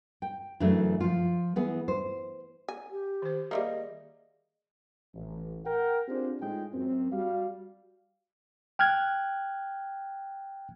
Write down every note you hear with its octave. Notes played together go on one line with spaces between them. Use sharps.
G5
F#2 C#3 E3 A3 D4
F3 F4
E3 B3 G#4
C5
G#5
G4
D#3 C5
G3 A3 A#3 G#4 D#5 E5
A1
A#4 F#5 G5
C4 D4 F4 G4 G#4 C5
A2 G#3 D#4 F4 G#4 G5
F#2 C4
G3 F#4 F5
G5 F6 F#6 G#6